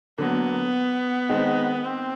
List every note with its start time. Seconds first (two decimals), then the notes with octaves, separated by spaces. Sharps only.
0.18 D3 F#3 A#3 B3
1.29 D#3 G#3 C4 D#4
1.84 C4